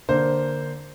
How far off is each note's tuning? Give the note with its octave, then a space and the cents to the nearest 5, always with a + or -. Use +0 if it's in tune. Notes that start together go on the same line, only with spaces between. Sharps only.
D3 +0 A#3 +0 C5 +0